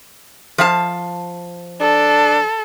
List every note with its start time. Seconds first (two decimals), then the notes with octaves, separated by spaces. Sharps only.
0.58 F3 F5 A5
1.81 D4 A4